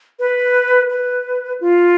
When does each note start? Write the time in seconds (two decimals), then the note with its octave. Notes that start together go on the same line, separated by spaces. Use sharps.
0.19 B4
0.90 B4
1.61 F4